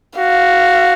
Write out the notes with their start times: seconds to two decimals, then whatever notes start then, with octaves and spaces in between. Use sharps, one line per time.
0.18 F#4 F5